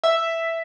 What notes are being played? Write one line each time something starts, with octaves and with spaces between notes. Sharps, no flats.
E5